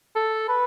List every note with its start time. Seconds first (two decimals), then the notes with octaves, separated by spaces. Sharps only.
0.15 A4
0.48 B4